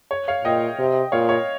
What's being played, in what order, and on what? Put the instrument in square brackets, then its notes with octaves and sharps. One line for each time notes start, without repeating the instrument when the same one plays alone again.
[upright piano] C#5
C#5 F5
[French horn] A#2 [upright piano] D#5 G5
[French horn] C3
[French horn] A#2 [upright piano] C#5 F5
[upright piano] C#5